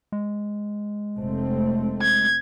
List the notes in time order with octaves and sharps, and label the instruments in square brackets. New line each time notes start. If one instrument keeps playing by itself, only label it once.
[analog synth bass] G#3
[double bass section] F1 A3 C4
[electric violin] G#6